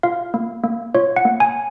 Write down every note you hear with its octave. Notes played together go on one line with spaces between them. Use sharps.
F4 F5
A#3
A#3
F4 C#5
F#5
A#3
G#5